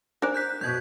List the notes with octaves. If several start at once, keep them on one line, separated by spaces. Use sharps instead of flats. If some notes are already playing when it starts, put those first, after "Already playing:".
D4 A#4 C5 D5
F#6 G6 B6
F#2 B2 G6 G#6